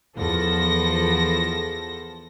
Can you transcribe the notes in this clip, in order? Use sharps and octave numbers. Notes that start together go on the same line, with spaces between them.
E2 F3 A4 A#6